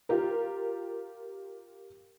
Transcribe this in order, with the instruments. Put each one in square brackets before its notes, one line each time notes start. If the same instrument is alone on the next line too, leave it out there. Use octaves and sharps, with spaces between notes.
[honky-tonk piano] F4 G4 A#4